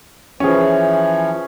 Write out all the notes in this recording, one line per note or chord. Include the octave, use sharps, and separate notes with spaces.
E3 F3 C#4 G#4